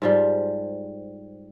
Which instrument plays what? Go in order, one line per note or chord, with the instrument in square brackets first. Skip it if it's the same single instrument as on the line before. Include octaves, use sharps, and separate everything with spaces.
[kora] G#2 F3 G3